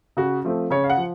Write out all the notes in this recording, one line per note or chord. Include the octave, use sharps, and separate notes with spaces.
C#3 F#4
F3 A3 C4
C#3 C#5
F5
F#5
F3